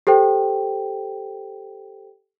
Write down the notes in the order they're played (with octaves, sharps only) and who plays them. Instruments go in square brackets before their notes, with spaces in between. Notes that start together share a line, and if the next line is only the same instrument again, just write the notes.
[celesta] G4 A4 C5 G5